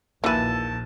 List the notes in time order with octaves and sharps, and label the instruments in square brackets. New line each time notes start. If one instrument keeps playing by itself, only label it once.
[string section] A#1 [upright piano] D#2 E6 D#7 [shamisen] E3 B4 [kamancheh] A5